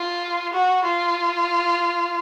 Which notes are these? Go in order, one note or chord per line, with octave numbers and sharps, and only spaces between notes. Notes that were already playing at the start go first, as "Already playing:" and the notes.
Already playing: F4
F#4
F4